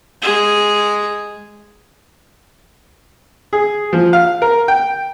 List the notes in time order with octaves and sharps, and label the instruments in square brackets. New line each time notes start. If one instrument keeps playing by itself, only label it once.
[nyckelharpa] G#3 G#4
[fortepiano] G#4
F3
F5
A#4
G5